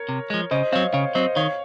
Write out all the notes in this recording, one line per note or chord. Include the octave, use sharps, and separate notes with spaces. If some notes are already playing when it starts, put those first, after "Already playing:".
Already playing: A#4 C#5
C3
F3 G#3
C#3 C5 D#5
F#3 C4 C#5 F5
C#3 C#5 F5
F#3 C4 C5 D#5
D#3 C#5 F5